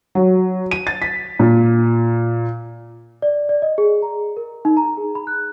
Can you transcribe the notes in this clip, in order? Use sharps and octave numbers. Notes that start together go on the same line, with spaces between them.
F#3
D#7
A6
B6
A#2
D5
D5
D#5
G#4
A#5
A#4
D#4
A#5
G#4
B5
F#6